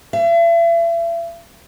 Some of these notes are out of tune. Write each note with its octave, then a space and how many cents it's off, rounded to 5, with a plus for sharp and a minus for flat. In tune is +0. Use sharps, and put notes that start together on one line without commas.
E5 +40